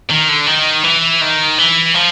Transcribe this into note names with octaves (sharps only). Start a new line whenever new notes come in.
D#3
D3
D#3
E3
D#3
E3
F3